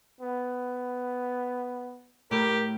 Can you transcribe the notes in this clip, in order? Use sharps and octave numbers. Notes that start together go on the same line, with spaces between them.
B3
A2 G4 A#4